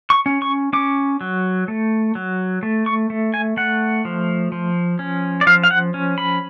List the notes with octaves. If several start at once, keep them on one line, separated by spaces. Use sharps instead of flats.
C#6
C#4
C#6
C#4 D6
F#3
A3
F#3
A3
C#6
A3
G#5
A3 F#5
F3
F3
C#4
D5
F3 F5
F5
F#5
C#4
B5